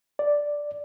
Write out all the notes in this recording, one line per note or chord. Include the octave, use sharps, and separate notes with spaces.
D5